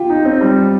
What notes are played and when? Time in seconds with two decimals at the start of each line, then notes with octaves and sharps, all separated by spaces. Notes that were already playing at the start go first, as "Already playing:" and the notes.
Already playing: F4 G4
0.10 D#4
0.25 C4
0.41 G3